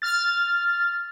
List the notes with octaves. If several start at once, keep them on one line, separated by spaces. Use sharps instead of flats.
F6 A6